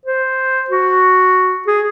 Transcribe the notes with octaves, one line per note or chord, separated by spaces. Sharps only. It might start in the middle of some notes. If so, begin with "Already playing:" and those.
C5
F#4
G#4